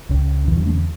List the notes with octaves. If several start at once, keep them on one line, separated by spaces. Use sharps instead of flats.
C#2 C#3
E2 B2 E3
D3 F#3
A3 C#4
D3